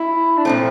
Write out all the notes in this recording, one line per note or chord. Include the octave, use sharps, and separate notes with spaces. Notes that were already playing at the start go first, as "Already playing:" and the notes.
Already playing: E4
D4
A#2 F3 A3 C4